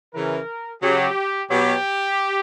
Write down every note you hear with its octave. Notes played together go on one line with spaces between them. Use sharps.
C#3 E3 A#4
C#3 F#3 G4
B2 F#3 G4